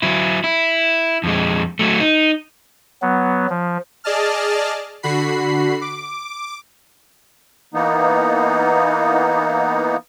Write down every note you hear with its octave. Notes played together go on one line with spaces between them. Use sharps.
F#3 E4
E4
F2 G#3
F#3 A3
D#4
F#3 B3
F3
G#4 D5 D#5 A5 F6
D3 F#4 B5 C7
D6
E3 A#3 B3 D#4